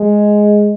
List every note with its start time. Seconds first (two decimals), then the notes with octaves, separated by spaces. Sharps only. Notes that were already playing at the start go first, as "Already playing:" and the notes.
Already playing: G#3